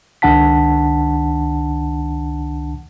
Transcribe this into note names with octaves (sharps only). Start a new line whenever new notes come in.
C#2 D#3 D4 F#5 A5 B6